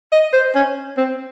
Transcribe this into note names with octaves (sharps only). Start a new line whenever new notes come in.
D#5
C5
C#4
C4